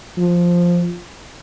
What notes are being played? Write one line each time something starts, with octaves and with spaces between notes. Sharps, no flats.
F3